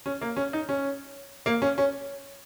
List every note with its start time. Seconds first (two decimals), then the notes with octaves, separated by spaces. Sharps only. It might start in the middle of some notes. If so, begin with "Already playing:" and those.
0.06 C#4
0.21 A#3
0.37 C#4
0.53 D#4
0.69 C#4
1.46 A#3
1.62 C#4
1.78 C#4